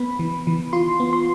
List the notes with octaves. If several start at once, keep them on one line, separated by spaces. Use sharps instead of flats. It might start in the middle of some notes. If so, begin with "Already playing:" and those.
Already playing: B3 B5
E3
E3
F4 C6
B3
C6